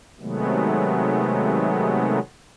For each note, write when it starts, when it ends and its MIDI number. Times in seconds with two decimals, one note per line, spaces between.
0.20 2.19 48
0.20 2.19 51
0.20 2.19 54
0.20 2.19 56
0.20 2.19 57
0.20 2.19 59